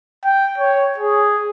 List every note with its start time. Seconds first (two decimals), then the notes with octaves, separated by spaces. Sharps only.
0.24 G5
0.58 C#5
0.98 G#4